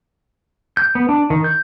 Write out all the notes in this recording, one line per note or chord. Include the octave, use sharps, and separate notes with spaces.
G6
B3
D4
D#3
G6